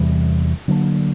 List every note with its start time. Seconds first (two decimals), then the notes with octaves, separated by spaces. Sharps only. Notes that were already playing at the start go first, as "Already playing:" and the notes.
Already playing: E2 C3 E3 G3
0.68 D3 F#3 A#3 D4